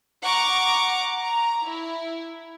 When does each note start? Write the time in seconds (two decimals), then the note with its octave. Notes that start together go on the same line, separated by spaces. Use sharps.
0.23 F#5 A#5 C#6 D6
1.21 A#5
1.67 E4